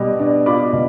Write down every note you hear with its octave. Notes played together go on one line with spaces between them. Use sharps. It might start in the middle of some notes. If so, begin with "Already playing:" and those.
Already playing: B2 G3
D4
F4 B5 D6
B2